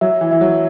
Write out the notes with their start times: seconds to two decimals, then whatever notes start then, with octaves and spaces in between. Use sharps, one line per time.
0.01 F#3 E5
0.21 E3
0.31 E3 E5
0.41 F#3